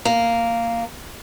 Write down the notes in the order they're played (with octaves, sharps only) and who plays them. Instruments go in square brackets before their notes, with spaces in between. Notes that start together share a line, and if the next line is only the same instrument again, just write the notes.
[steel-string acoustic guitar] A#3